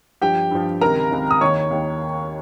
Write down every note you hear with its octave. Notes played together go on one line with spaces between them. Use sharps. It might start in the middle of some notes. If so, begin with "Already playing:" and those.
G2 F3 G4 G5
G2 F3
C#2 C3 D#3 A#4 A#5
C#2 C3 D#3
D#6
D#2 D#3 C#5 C#6
D#2 D#3